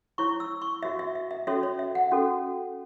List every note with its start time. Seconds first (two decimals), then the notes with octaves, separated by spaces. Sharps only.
0.18 E4 C#5 C#6
0.40 E6
0.62 C#6
0.82 F#4 C#5 E5
0.99 E5
1.15 E5
1.31 E5
1.47 C#4 F#4 A4 C#5 E5
1.63 C#5
1.79 E5
1.95 F#5
2.11 C#4 F#4 A4